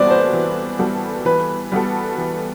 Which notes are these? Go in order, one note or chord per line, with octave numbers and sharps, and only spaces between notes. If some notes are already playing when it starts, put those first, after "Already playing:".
Already playing: E3 G3 B3 F#4 A4 C5 D5
C5
E3
G3 B3 F#4 A4
E3 B4
G3 B3 F#4 A4
E3